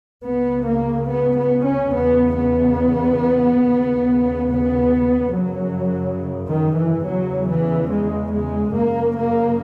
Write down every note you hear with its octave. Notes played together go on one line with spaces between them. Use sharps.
C#2 C#3 B3
A#3
B3
B3
C#4
E2 C#3 B3
B3
D#2 C#3
B3
F#2 C#3 F#3
D#3
E3
E2 C#3 F#3
E3
G#3
G#3
F#2 C#3 A#3
A#3